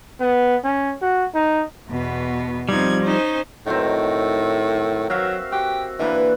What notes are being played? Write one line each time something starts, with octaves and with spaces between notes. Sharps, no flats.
B3
C#4
F#4
D#4
E2 B2 B3
F3 G3 C4 D#4 G#6
C#4 D#4 C5
A2 D#3 F#3 C4
F#3 F#4 E5 F5
F#4 G4
D3 E3 A#3 B4